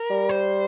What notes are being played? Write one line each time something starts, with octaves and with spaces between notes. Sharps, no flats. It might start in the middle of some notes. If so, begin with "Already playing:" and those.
Already playing: A#4
G3
C5